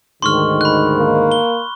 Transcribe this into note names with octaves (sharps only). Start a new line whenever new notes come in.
D2 G#2 D#3 C6 C#6 F6
B5 F#6
A#3
G7